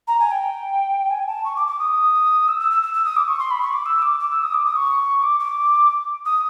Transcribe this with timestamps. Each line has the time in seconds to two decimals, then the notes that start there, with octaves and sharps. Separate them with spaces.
0.07 A#5
0.19 G#5
0.30 G5
1.10 G#5
1.27 A5
1.44 C#6
1.55 D6
1.67 D6
1.78 D#6
2.48 E6
2.59 E6
2.70 E6
2.82 E6
2.93 E6
3.04 D#6
3.16 D6
3.28 C#6
3.39 C6
3.50 B5
3.61 C#6
3.73 D6
3.85 E6
4.02 D6
4.19 D6
4.30 E6
4.42 D#6
4.53 D6
4.65 D#6
4.76 C#6
5.22 D6
5.39 D6
6.25 D#6